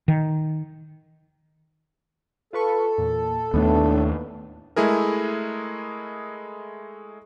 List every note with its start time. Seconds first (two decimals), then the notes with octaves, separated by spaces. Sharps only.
0.08 D#3
2.53 F4 A4 B4 C#6
2.98 E2 A#2
3.54 D#2 A2 A3 B3 D4
4.76 G#3 A3 E4 G#4 A#4